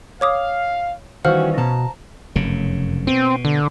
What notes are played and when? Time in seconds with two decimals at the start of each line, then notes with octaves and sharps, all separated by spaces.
0.21 C#5 F5 D6 D#6
1.25 D#3 E3 G3 C#4 F#4 C5 F5 F6
1.58 B2 A5 A#5
2.36 F1 F#2 C#3
3.07 B2 C4
3.45 D3